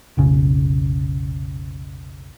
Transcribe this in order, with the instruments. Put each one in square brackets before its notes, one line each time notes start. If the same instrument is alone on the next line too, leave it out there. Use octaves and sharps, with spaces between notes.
[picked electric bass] F1 B1 C#3